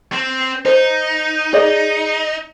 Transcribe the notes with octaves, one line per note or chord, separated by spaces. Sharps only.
C4
D#4 C5
G#4 D5 D#5